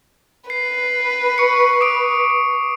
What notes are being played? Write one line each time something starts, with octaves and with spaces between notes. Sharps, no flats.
B4 C7
C#6 C#7
D6 D#6 D7